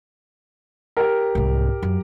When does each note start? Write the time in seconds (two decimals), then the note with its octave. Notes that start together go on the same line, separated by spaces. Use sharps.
0.97 G4 A#4
1.35 C2 G#2
1.83 F#2